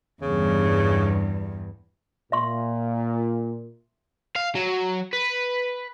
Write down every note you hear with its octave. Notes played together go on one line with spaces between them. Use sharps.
E2 G2 C#3
A#2 E5 C6
F5
F#3
B4